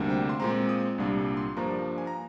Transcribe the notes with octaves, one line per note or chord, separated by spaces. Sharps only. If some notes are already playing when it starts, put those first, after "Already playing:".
Already playing: D2 C3 G3 A#3 D4
G5
C6
A#2 G#3 C4 A#5
D#6
C2 A#2 G3 A#3 D4
C6
G2 F3 A#3 D4 A#5
G#5
A#5